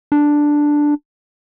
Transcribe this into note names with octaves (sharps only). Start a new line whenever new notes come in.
D4